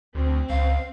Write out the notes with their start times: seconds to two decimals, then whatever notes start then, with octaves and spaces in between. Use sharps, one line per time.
0.15 D2 C4
0.49 C#2 F5